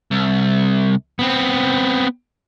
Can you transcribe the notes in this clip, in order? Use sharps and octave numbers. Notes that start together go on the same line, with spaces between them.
C2
B3 C4